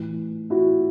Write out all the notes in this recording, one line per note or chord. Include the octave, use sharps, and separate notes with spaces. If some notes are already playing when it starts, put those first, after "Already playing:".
Already playing: A2 E3
E4 F#4